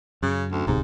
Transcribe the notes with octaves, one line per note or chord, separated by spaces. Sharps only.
F#2 C#3
D2
D1 B1 G#2 C3